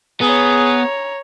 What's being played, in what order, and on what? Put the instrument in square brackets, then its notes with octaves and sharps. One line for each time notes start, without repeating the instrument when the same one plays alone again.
[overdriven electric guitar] B3 [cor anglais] G#4 [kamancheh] C#5 A#5